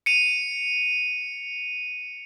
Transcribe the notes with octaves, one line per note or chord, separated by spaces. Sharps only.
C#7 D#7 F7